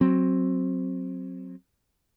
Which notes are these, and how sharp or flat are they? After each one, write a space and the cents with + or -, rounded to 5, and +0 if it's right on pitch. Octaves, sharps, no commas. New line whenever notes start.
F#3 +0 C4 +10